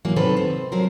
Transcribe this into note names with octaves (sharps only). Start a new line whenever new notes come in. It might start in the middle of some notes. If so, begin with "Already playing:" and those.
E3 F#3 A#3
C3 D#3 F#3 C4 A4 B4
C4
F3 F#3 C4 A#4